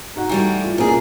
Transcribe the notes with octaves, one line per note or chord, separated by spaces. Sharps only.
D#4 F#4 F#5
E3 G3 A3
F4
B2 A#3 C#4 F4 G#4